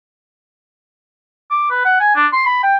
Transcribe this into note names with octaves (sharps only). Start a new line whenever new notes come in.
D6
B4
F#5
G#5
D4
C6
B5
G5